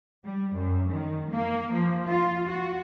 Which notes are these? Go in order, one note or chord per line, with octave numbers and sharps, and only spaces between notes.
G3
F#2
D#3
A#3
F3
F4
F#4